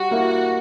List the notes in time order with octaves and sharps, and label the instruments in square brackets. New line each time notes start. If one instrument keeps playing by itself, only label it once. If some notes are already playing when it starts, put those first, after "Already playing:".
Already playing: [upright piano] G3 [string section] F#4
[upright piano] A#3 E4